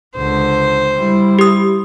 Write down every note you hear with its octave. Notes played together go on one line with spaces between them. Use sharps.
C#2 D3 C5
G3 E4
G4 D#6